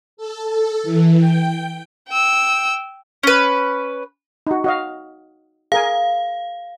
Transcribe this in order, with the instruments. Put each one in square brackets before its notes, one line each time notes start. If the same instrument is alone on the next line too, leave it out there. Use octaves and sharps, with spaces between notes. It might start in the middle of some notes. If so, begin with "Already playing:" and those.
[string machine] A4
A4
E3
G5
[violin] G5 E6
[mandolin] C#4 B4
[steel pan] D#4 F#4
F#4 D#5 F5
[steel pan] G#4 A#4 G#5 [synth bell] F5